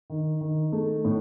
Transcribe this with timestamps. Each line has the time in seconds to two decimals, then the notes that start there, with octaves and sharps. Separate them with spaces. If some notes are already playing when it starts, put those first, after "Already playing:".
0.10 D#3
0.41 D#3
0.72 A3
1.05 A2